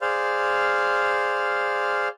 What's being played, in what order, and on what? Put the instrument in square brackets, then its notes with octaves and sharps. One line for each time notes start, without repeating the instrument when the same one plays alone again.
[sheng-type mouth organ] G#4 C5 D5 F5 C6 F6